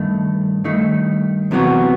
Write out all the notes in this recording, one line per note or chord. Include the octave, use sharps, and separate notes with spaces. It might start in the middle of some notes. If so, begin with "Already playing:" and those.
Already playing: G2 D#3 A3
G2 D#3 A3
E2 C3 F#3 B3 F#4